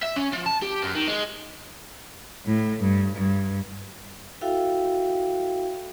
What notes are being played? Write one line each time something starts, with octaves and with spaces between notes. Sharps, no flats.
E5
C#4
F3
A5
G4
F#2
D#3
G#3
A2
G2
G2
E4 F#4 A4 E5 F5 G5